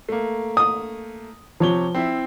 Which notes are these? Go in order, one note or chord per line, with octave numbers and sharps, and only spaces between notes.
A3 A#3
D#6
C3 F3 C#5 G7
C4 E4 E5